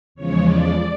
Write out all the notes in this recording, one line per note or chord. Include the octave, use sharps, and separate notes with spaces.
E2 C#3 F3 G#3 C#5
D5